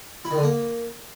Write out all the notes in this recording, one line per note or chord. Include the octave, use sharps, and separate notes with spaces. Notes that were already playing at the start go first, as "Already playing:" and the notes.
E4
D#3
D3
A#3